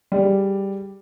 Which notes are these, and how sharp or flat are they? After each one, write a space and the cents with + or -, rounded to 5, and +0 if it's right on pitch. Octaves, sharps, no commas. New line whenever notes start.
G3 +0 G#4 +0 D5 +0